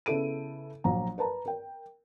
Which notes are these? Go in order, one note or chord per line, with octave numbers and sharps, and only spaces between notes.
C#3 B3 E4 A4 D7 D#7
A#1 F#3 A#5
A#4 B4 A5 A#5
A#4 G5